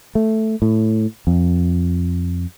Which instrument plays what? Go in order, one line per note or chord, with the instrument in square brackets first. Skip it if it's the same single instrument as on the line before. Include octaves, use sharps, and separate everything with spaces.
[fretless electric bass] A3
A2
F2